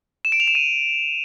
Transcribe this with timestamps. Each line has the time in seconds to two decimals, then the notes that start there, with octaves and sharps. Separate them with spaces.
0.25 E7
0.32 D7
0.40 F7
0.48 E7
0.55 D#7